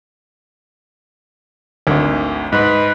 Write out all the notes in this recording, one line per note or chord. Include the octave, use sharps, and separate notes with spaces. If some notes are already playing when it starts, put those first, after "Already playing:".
G#1 D2
G#2 B4